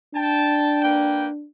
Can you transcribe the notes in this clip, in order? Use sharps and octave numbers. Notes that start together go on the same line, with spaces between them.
D4 G5 A5
A#3 B4 G5